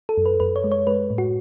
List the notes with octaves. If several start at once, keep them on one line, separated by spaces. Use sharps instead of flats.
A4
F#2
B4
F#2 B4
C#5
G#3
C#5
G#3 B4
A2
F#4